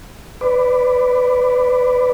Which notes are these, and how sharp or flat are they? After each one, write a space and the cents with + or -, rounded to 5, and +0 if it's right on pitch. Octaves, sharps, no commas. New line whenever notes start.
B4 +20 D5 +0